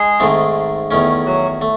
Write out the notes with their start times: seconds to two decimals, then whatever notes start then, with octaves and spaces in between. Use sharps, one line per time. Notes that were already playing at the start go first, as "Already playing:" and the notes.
Already playing: G#3 G#4
0.20 G#2 D#3 A3 C4
0.91 E2 D#3 A3 C#4
1.26 F#3 F#4
1.62 A3